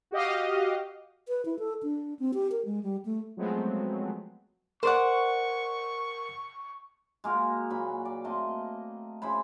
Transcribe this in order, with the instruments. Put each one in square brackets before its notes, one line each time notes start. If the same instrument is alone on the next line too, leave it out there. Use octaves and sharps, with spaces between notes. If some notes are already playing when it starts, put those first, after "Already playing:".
[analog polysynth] F#4 G4 D#5 F5
[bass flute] B4
E4
A4
D4
C4
G4
A#4
G#3
G3
A3
[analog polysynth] F3 F#3 G#3 A3 B3 C4
[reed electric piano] A#4 [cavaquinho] C5 D5 F#5 [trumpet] C#6
[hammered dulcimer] G#3 A#3 F#4 A#4
A#2 F#3 B5
D5
A3 A#3 C4 D#5
C#3 E4 C5 B5